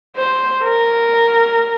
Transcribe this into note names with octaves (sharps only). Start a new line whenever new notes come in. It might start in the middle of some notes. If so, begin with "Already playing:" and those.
C5
A#4